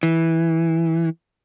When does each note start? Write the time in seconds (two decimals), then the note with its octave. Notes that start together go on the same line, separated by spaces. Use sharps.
0.03 E3